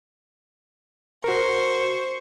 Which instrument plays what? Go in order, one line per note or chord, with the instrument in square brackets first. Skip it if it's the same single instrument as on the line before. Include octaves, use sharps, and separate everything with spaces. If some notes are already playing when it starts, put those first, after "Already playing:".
[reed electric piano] F#4 A#4 [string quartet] C5 C#6